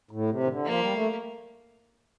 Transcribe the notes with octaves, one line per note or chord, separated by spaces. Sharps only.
A2
C3
D#3
D3
F3 A#3
G3
A3